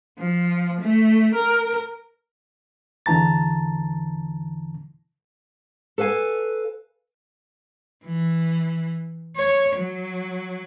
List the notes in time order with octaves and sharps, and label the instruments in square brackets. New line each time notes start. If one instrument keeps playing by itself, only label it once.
[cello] F3
A3
A#4
[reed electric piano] E2 D3 E3 A5 A#5 A6
[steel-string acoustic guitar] A4 B4 F5 G#5
[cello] E3
C#5
F#3